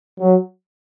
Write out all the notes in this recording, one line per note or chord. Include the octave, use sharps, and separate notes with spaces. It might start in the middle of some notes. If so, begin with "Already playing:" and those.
F#3